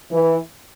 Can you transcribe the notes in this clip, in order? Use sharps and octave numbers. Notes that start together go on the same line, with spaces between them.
E3